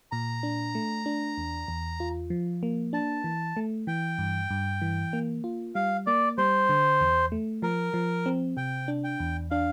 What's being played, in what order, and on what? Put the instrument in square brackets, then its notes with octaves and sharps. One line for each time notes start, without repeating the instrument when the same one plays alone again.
[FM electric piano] A#2 [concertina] A#5
[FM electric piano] D4
A3
D4
E2
E2
F4
F3
A#3
[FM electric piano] D4 [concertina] A5
[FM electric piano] E3
A3
[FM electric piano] E3 [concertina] G5
[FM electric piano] G2
G2
E3
A#3
F4
[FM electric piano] G3 [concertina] F5
[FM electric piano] A#3 [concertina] D5
[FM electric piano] G3 [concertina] C5
[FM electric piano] D3
E2
A3
[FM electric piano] F3 [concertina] A#4
[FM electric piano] F3
C4
[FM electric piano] C3 [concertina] G5
[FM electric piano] D4
[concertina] G5
[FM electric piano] E2
[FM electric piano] D4 [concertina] F5